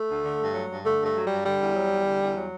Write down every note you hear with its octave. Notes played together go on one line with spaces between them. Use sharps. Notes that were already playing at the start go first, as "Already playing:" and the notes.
Already playing: A3
D2
D3
G2
F#3
G2
D3 A3
G2
A3
F#3
G2 G3
D3 G3
E2
F#3
E2
D3
E2
F#3